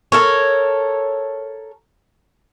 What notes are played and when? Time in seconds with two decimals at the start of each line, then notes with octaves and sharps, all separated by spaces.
0.12 A4 A#4 C#5